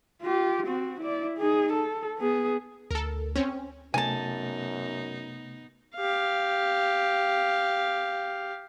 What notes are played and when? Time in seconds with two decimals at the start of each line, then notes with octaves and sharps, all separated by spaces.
0.22 F4 G4
0.67 C4 F#4
1.01 E4 D5
1.38 D#4 G#4
1.73 A4
2.19 B3 G#4
2.91 D2 A4 A#4
3.36 C4 C#4
3.94 F#2 C3 A3 B3 D#4 G#5 A5
5.95 G4 F5